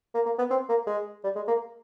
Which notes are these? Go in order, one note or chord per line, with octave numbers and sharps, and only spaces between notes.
A#3
A#3
B3
C4
A#3
G#3
G3
G#3
A#3